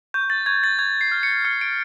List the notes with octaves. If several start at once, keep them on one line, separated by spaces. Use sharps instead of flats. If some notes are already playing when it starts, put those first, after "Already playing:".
C#6 G6
A6
C#6 G#6
A6
C#6 G#6
C7
F6
C#7
F6 C#7
D7